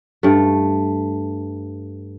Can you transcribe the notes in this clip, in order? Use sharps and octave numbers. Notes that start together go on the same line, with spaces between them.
G2 A3